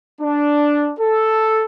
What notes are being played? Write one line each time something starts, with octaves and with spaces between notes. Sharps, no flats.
D4
A4